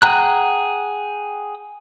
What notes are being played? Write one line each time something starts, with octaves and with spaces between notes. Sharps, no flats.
G#4 F#5 G5 A#5 F#6